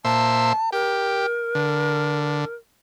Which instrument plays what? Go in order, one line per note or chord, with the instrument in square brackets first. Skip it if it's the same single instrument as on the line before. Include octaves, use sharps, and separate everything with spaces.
[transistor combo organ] A#2 C5 E5 [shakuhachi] A5
[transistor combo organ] G4 [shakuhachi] A#4
[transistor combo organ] D3